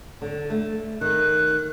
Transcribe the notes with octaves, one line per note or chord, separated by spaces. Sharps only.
D3
A3
D#3 F#6